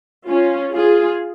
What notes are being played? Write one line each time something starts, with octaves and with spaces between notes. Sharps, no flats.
C#4 F4
F4 G#4